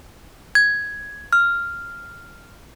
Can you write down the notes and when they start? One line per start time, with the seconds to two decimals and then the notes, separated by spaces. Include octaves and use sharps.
0.55 G#6
1.33 F6